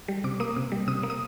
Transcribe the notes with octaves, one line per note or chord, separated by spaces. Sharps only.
G3
C3 D6
A#3 D#6
C3
G3
C3 D#6
A#3
D#6